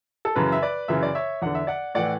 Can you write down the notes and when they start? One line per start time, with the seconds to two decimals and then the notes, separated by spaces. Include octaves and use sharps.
0.25 A4
0.36 F#2 C#3 E3 B4
0.52 E5
0.62 B4 D5
0.88 F#2 C#3 E3 E5
1.03 D5
1.15 C#5 E5
1.42 E2 D3 F#5
1.55 E5
1.67 D5 F#5
1.95 A2 E3 D5 F#5